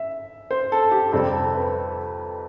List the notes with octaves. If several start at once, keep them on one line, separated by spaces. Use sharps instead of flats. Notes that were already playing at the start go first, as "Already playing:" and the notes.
Already playing: E5
C5
A4
G4
F2 C3 G3 C4 A4
A4
B4